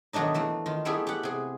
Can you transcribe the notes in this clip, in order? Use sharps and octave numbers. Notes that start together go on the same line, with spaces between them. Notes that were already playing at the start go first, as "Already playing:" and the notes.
B2 D#3 F#3 A3 D4 D#4
E3 A3 A#3
D#3 F4
G3 A3 B3 E4 G4 G#4
G4 F#5
C3 G#4